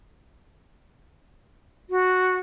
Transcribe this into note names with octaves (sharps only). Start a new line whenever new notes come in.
F#4